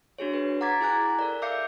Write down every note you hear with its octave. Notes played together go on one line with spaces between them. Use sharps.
D4 F#4 G#4 C#5
B4
F#5 A#5 D6 G#6 A6 B6
E4 G#4 G#5 A#5 F#6
A4 A#4 D5
E5 F5 D6 G6 C7 C#7